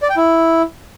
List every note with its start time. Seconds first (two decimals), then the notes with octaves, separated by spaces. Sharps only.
0.02 D5
0.10 G5
0.17 E4